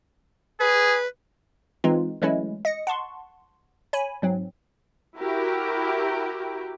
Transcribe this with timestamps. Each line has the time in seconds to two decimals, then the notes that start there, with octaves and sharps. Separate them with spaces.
0.60 G#4 B4
1.84 E3 G#3 C4 D#4 F4
2.22 E3 F#3 G#3 A3 C#4 E4
2.65 D#5 A#6 C#7
2.87 F#5 A5 C6 C#6
3.93 C#5 G#5 B5
4.22 G#2 F#3 C4
5.19 E4 F#4 G4 A#4